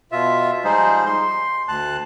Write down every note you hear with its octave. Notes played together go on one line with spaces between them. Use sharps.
B2 F4 E5
F3 G3 G#3 D#4 G#4 C5
C6
D2 A5 F#6